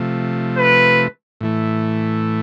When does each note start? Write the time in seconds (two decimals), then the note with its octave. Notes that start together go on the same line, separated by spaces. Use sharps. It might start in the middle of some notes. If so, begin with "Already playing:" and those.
Already playing: C3 F3 A3
0.57 B4
1.41 A2 E3 A3